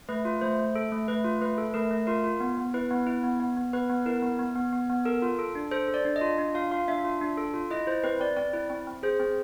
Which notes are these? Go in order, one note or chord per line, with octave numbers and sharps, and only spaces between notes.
A3 B4
F4
A3 C5
A3
A4
A3
A3 B4
F4
A3 B4
A4
A3 A#4
A3
F4 A#4
F4
B3
B3
E4 B4
B3
E4
B3
B3
B3
B3 B4
B3
E4 A#4
B3
B3
B3
B3
B3
A4 A#4
F4
A4
D4
A4 C5
A4
D5
D4
D#5
F4
D4
F4 F5
F4 F5
D4 E5
F4
D4
A4
F4
E4 D#5
E4 C5
C4 B4
C4 D5
C4 D5
E4
C4
C4
G#4 C5
C4